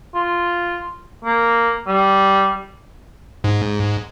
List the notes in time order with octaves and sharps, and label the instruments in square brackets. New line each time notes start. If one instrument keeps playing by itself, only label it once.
[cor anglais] F4
A#3
G3
[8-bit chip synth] G#2